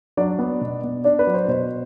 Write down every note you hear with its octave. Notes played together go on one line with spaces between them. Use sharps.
F#3 D4 D5
B3
B2
B3
D4 D5
B4
F#3
C5
B2 C5